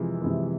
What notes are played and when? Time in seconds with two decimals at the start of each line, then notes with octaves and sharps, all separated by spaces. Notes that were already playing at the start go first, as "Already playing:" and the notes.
Already playing: F2 C3 E3 F3 G#3
0.22 C3 E3 G#3